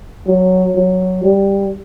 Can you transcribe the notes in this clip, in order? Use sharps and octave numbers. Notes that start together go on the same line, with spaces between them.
F#3
F#3
G3